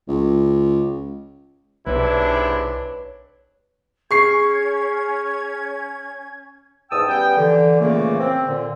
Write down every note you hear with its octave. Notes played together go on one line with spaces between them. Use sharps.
C#2
B1 G#2 C3 D4 E4 B4 C#5
C#4 G#4 C#6 G#6 C7
E2 G#2 G5 A5 D#6 E6
G3 B3 C#4 G5
D3 E3
A#2 C#3 E3 A3 A#3
C4
A#2 D3